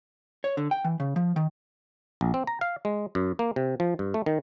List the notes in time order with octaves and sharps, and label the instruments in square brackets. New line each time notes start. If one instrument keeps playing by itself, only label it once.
[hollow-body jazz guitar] C#5
D3
G5
E3
C#3
F3
D#3
[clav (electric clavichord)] A#1
C4
A#5
F5
G#3
F#2
A#3
C3
F3
G2
A3
D#3